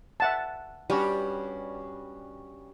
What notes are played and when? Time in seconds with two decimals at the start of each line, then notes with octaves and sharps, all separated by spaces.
0.20 E5 F#5 A5
0.90 G2 G3 C#4 F#4